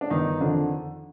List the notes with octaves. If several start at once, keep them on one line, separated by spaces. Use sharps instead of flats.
D4
G1 D#3 D#4
F2 D3 D#3 D4